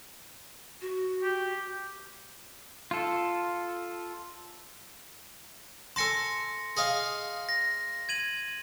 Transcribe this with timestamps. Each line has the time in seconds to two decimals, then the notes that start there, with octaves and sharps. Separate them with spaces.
0.81 F#4
1.23 G4
2.91 F4 A4
5.96 A4 G#5 A5 C6 A#6 C#7
6.77 G#4 D#5 F5
7.49 A#6
8.09 G#6 D#7 F#7